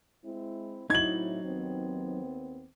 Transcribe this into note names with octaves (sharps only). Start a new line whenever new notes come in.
G#3 C4 E4
A2 F#3 C4 D#4 E4 G#6 F#7
D#2 B3 C4